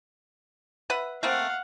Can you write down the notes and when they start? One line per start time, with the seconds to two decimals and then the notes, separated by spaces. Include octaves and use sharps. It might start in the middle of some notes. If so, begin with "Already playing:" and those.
0.90 B4 E5 F#5
1.23 A3 A#3 C4 F5 F#5